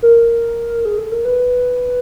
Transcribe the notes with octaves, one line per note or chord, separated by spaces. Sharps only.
A#4
G#4
A4
A#4
B4